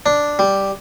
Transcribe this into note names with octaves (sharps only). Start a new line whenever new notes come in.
D4
G3